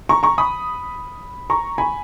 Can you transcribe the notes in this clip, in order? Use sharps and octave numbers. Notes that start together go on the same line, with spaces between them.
A#5 C#6
A#5 C#6
B5 D#6
A#5 C#6
G#5 B5